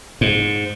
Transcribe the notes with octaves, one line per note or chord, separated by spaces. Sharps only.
G#2